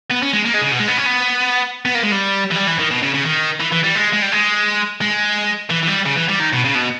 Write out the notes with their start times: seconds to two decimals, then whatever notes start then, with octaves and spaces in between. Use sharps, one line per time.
0.10 B3
0.22 C#4
0.33 G#3
0.46 A#3
0.54 G#3
0.63 C#3
0.72 B2
0.80 G#3
0.89 B3
0.98 C#4
1.06 B3
1.85 B3
1.95 A#3
2.03 G#3
2.12 G3
2.51 E3
2.56 G3
2.67 E3
2.79 D#3
2.91 B2
3.03 C#3
3.14 C#3
3.25 D#3
3.60 E3
3.72 E3
3.84 G3
3.95 G#3
4.13 G#3
4.22 G3
4.32 G#3
5.01 G#3
5.70 E3
5.83 E3
5.88 G3
6.06 C#3
6.17 E3
6.29 G3
6.40 D#3
6.53 B2
6.65 C#3
6.75 B2